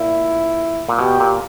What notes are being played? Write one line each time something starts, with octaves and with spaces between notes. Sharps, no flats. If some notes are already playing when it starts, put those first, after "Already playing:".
Already playing: A#2 E4
A#2
B2 G4
A#2